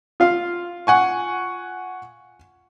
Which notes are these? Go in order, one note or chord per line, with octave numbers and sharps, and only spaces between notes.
F4 F5
F#5 G#5 C#6